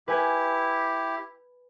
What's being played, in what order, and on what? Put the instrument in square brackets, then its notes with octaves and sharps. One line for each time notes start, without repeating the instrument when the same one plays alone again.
[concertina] E4 G4 [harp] B4 G#5